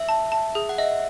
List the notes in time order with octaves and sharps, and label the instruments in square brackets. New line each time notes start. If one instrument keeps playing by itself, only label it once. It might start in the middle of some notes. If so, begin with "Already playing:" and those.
Already playing: [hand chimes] E5
[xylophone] A5
A5
G#4
[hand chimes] F#5
[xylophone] D#5 [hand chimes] E5